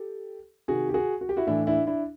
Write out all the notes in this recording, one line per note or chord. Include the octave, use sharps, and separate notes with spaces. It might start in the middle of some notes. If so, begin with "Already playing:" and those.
Already playing: G4 A4
C3 D#3 F#4 G#4
G4
F#4 G#4
F#4
G4
E4 F#4
A2 E3 D4 E4
D4 E4
D4 E4